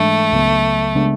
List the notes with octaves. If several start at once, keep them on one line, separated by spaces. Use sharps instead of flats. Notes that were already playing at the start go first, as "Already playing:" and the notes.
Already playing: G#2 E3 G#3 A3 D4
C#2 C#3 F#3 B3
C#3 G#3 B3 D4